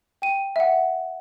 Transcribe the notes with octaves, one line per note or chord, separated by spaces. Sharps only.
G5 D#7
E5 F#5